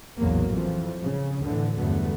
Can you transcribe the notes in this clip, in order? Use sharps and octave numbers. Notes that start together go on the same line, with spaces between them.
A#1 E2 A2 F#3 A#3
F2 E3 F3
C#3
D2 A2 D3 E3
E2 G2 D3 F#3 A3 B3